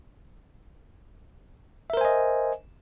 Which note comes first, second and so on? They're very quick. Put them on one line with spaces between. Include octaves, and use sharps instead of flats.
E5 A#4 C5 G#5 D#5